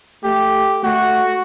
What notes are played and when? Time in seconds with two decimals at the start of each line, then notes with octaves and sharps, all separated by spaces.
0.24 A3 G4
0.83 A3 F#4